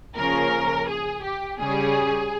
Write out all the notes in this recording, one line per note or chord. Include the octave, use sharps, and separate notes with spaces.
C#3 F3 A#3 C#4 A#4
G#4
G4
C#3 G3 C#4 G#4